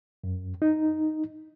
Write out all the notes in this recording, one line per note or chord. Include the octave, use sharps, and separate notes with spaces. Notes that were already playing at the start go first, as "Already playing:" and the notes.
F#2
D#4